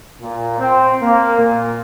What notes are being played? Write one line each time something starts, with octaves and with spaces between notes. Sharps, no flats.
A#2
C4
A#3
A#2